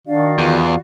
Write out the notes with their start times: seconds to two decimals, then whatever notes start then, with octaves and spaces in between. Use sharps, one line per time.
0.07 D#3 D4 F#4 D5 F5
0.39 E2 F4